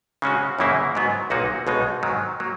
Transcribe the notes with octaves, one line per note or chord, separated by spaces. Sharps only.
C#3 G#3 C#4 F#4
F#2 C#3 E3 A#3 E4
G#2 F#3 B3
B1 A#2 A#3 D#4 F#4
B1 B2 G#3 D#4
G#2 D#3 F#3
F#3 A#3